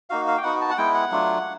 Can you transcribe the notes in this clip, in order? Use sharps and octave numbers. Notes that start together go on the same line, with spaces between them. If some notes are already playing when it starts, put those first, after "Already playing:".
A#3 D#4 F#4 F5
F5
G5
B3 D#4 F#4 F#5
A5
F#5
G#3 B3 E4 G5
F#5
F#3 A3 D4 F4